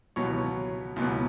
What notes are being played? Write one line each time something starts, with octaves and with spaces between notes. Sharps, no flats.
C#2 B2 F#3 B3 C#5
C#2 B2 F#3 B3